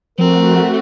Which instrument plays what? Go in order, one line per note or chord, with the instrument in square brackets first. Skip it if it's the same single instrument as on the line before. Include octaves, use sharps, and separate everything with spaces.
[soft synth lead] F3 [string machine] A3 F#4 [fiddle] C4 [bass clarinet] A#4